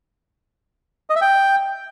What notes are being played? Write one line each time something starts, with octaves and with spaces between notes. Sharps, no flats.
D#5
E5
G5